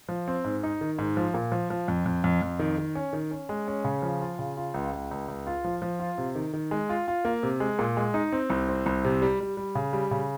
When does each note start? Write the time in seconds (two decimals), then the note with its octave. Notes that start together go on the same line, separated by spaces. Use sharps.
0.09 F3
0.28 C4
0.44 G#2
0.63 D#4
0.81 D#3
0.98 G#2
1.17 F3
1.34 A#2
1.52 F3
1.70 F3
1.88 F2
2.06 F2
2.24 F2
2.42 F2
2.59 D#3
2.78 D#3
2.95 C#4
3.13 D#3
3.31 C#4
3.49 G#3
3.68 C#4
3.84 C#3
4.02 F3
4.21 F4
4.39 C#3
4.57 F4
4.74 C#2
4.92 C#2
5.11 C#2
5.28 C#2
5.47 F4
5.64 F3
5.82 F3
6.00 F4
6.18 C3
6.35 D#3
6.53 D#3
6.71 G#3
6.89 F4
7.08 F4
7.25 A#3
7.43 C3
7.60 G#3
7.79 A#2
7.97 G#3
8.14 D#4
8.32 C4
8.50 C2
8.69 C4
8.86 C2
9.05 C3
9.22 G3
9.40 G3
9.57 G3
9.75 C#3
9.93 G3
10.11 C#3